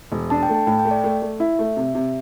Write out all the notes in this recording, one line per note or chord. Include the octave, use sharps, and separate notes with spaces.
E1
D4 A5
G5
A3
A5
A2 G5
G5
A3
D5
A3
A3
E4 E5
A3
C3
C3